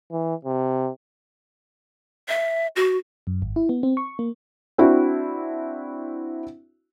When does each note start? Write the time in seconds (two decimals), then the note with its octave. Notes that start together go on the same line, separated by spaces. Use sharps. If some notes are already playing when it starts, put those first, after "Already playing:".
0.12 E3
0.45 C3
2.28 E5
2.76 F#4
3.27 F#2
3.42 G#1
3.56 E4
3.69 B3
3.83 C4
3.97 C#6
4.19 A#3
4.78 C4 D4 E4 F#4